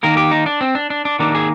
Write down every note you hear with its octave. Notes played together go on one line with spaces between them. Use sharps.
D#3 A#3 A#4
G4
D#4
D4
C4
D4
D4
D4
D#3 A#3 D4
G#4